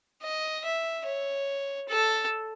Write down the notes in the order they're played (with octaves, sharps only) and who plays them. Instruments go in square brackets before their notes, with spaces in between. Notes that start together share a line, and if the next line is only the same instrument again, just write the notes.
[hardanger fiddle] D#5
E5
C#5
A4